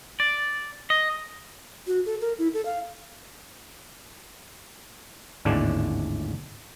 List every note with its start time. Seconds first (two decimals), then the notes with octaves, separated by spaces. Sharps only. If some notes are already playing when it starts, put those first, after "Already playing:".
0.20 D5
0.90 D#5
1.87 F#4
2.06 A4
2.21 A#4
2.39 E4
2.54 A4
2.66 F5
5.45 G#1 D#2 A2 D3 G#3 D4